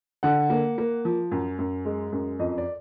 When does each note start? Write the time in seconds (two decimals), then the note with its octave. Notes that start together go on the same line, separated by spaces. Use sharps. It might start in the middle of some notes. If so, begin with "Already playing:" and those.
0.23 D3 F#5
0.50 A#3
0.78 A#3
1.05 F3
1.32 F#2
1.59 F#2
1.85 G#3
2.12 F#2
2.39 F2 D#5
2.58 D5